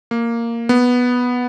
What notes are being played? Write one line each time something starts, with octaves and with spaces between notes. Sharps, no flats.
A#3
B3